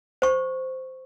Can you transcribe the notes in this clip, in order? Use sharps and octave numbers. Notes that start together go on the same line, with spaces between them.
C5 C#6